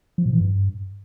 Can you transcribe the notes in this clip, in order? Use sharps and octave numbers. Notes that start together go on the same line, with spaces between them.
F3
A#2
E3
G2